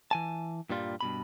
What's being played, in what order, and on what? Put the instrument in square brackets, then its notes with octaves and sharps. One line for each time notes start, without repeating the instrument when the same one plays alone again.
[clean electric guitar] E3 G#5 A5
G2 A#2 G3 F4
G2 B2 B5